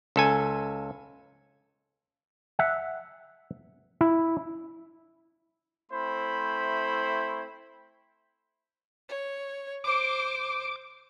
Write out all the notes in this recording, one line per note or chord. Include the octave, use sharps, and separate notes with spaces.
C#2 A4 G#5
E5 F#5
E4
A3 C4 E4 C5 B5
C#5
C5 D6